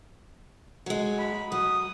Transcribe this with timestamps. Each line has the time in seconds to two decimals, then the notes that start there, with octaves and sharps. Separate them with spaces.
0.86 F#3 G#3
1.18 B5
1.52 F#3 D#6